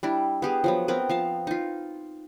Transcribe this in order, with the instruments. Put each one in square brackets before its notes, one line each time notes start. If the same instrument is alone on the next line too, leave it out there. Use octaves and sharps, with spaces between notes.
[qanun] G3 D4 E4
B3 G4 G#4
F3 F#3 B3
B3 C4 A#4 B4
F3 F5 A5
D#4 F4